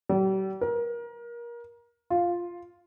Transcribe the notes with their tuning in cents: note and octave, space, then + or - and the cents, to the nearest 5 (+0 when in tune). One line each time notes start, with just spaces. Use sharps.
G3 -40
A#4 +25
F4 +0